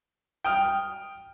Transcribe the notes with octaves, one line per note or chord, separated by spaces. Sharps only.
G5 D#6 F6